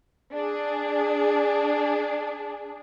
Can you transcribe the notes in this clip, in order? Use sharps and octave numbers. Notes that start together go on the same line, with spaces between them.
D4 G#4